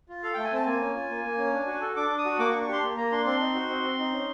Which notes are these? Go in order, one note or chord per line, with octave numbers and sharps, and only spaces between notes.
F4
A4 F5
A3 G5
G#5
C4 A5
A#3 G#5
C#4
F4
A#3
A#3
C#4
D4
F#4
A4
D4 D6
D4
D#6
F#4
A#3 D6
C#6
D4
C#6
G4 C6
A#3
A#3 A#5
D4 C6
C4 C6
D#4
F#4
C4
C4
D#4
C#4